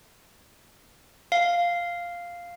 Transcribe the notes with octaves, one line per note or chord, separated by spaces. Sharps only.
F5